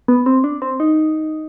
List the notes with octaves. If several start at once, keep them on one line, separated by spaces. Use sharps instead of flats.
B3
C4
D4
C4
D#4